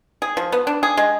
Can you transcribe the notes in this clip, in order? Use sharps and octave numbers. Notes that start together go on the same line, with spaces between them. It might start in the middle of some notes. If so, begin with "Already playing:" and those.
G#4
F3
B3
D4
G#4
G#3